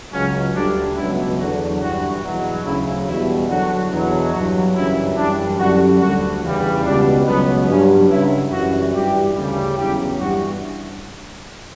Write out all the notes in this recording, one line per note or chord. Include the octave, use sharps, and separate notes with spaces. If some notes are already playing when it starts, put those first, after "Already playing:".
C#2 C#3 F#3 C#4
D2 D3 G3 D4
C#2 B2 F#3 E4
E2 D3 F#3 F#4
G2 E3 G3 F#4
E2 B2 F#3
D2 C#3 F#3 E4
E2 B2 G3 E4
E2 D3 F#3 F#4
E2 B2 F#3
G2 F#3 F#4
F#2 C#3 E3 G3 E4
F#2 E3 G3 D4
F#2 D3 G3 F#4
D2 D3 G3 F#4
E2 C#3 E3 G3
C#2 B2 G3 D4
C#2 B2 F#3 B3
G2 F#3 C#4
C#2 C#3 F#3 E4
F#2 E3 G3 F#4
G2 E3 G3 G4
D2 C#3 G3
E2 C#3 F#3 G4
G2 E3 G3 F#4